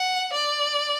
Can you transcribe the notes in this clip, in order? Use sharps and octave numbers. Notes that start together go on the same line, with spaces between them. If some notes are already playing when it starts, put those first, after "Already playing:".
Already playing: F#5
D5